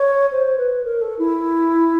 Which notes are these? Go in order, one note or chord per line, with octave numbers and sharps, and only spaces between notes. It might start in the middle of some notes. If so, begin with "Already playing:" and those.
Already playing: C#5
C5
B4
A#4
A4
E4